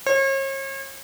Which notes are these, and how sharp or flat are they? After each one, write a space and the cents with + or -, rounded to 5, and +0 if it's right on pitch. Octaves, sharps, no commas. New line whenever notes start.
C#5 -40